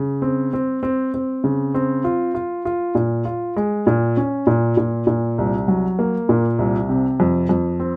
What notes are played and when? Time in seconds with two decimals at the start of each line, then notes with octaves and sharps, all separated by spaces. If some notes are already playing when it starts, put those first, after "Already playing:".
Already playing: C#3
0.22 C4
0.53 C4
0.83 C4
1.14 C4
1.44 C#3
1.74 C4
2.04 F4
2.35 F4
2.65 F4
2.95 A#2
3.25 F4
3.56 G#3
3.87 A#2
4.17 C#4
4.47 A#2
4.77 A#2
5.07 A#2
5.38 C2
5.68 F#3
5.99 A#3
6.29 A#2
6.59 C2
6.89 C3
7.20 F2
7.49 F2
7.80 C4